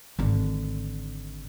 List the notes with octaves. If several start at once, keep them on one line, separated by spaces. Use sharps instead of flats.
G#1 D3